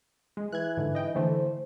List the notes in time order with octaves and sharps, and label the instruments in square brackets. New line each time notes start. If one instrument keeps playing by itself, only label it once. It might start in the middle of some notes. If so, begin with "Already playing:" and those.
[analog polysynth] G#3
[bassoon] E3 [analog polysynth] F#6 G#6
[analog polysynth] G#2 D3
D#5 G5
[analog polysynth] D3 E3 A3 [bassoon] C5